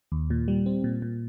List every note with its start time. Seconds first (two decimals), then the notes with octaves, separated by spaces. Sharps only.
0.12 D#2
0.30 A#2
0.48 G3
0.66 C4
0.84 A#2
1.02 A#2